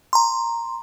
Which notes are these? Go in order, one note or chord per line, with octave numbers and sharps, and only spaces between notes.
A#5 C6